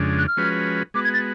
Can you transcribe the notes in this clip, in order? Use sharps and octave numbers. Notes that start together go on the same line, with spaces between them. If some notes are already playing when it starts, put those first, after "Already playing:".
Already playing: F2 C#3 G#3 D4
F#6
F6
F3 G#3 C#4 F#4 B4
G#3 B3 F#4 D6
G#6
A6